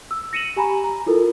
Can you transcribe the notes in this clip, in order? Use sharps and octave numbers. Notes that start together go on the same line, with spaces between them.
E6
A#6 C#7 D#7 E7 F#7
G4 G#5 A#5 B5
A#5
E4 F4 A4 A#4